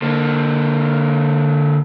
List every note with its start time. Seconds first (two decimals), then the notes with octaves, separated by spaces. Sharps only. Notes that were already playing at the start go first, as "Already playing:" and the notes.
0.02 D3 A#3